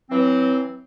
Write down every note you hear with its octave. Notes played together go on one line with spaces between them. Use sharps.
E3 F#3 C4